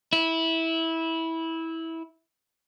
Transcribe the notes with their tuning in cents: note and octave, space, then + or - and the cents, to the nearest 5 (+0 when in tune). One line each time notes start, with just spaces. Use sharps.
E4 -15